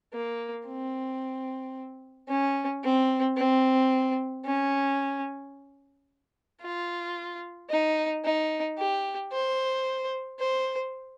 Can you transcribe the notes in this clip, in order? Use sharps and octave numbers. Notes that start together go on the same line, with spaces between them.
A#3
C4
C#4
C4
C4
C#4
F4
D#4
D#4
G4
C5
C5